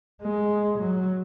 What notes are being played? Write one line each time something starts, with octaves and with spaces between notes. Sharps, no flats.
G#3
F#3